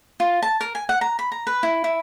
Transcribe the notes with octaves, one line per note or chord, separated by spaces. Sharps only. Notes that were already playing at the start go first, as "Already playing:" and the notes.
F4
A5
A#4
G#5
F#5
A#5
B5
A#5
B4
E4
E4